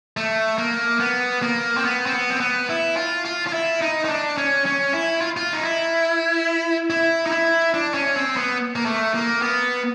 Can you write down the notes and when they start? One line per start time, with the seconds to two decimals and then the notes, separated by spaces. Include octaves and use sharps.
0.17 A3
0.58 A#3
1.00 B3
1.42 A#3
1.77 C4
1.85 B3
2.06 C4
2.12 B3
2.30 C4
2.40 B3
2.69 E4
2.97 F4
3.25 F4
3.47 F4
3.53 E4
3.81 D#4
4.05 D#4
4.09 D4
4.38 C#4
4.66 C#4
4.93 E4
5.21 F4
5.37 F4
5.53 D#4
5.63 E4
6.90 E4
7.26 D#4
7.31 E4
7.74 D4
7.94 C#4
8.16 C4
8.37 B3
8.76 A#3
8.85 A3
9.14 A#3
9.42 B3